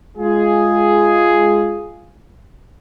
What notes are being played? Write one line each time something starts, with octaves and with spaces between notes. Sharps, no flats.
G#3 F4 G#4